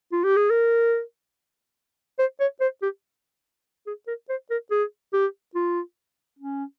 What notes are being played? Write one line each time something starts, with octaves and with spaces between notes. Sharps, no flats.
F4
G4
G#4
A#4
C5
C#5
C5
G4
G#4
A#4
C5
A#4
G#4
G4
F4
C#4